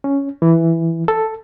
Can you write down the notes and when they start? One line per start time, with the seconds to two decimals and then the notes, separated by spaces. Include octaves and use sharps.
0.04 C#4
0.42 E3
1.08 A4